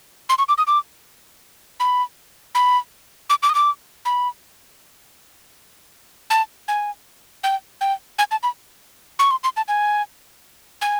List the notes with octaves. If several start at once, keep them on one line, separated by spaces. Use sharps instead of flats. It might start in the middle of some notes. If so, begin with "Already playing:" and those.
C6
C#6
D6
D#6
D6
B5
B5
D6
D6
D#6
D6
B5
A5
G#5
G5
G5
G#5
A5
B5
C#6
C6
C6
A5
G#5
G#5